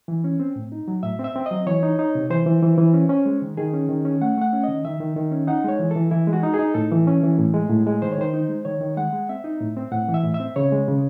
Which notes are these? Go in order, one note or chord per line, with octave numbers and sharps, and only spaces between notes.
E3
C#4
C4
A2
D#4
F#3
A2 E5
C4
E5
C4
F#3 D#5
E3 C#5
D#4
D#4
C3
E3 C5
E3
E3
E3
C#4
C#4
G#3
D#3
D#3 G#4
C#4
D#3
C#4
A3 F#5
A3 F#5
C#4
D#3 D#5
D#3 E5
D#3
D#3
C#4
D#4 F#5
G#3 C#5
E3
E3 A4
E3 E4
G#3
F#4
D#4
G#4
D#4
A2 A4
E3
C#4
E3
A2
G#3
A2
G#3
D#3 C5
C#5
D#3 C5
D#4
G#3
D#3 C#5
D#3
G#3 F#5
G#3
C4 E5
D#4
A2
C4
A2 F#5
E3
E5
A2
E5
C4
C#3 C#5
G#3
C#3